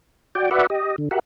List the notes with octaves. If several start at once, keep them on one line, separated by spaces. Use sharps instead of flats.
F#4 D5 G5
F#4 B4 D5 E5 F#5
G4 D#5
D3
F#4 G4 A#4 E5 F#5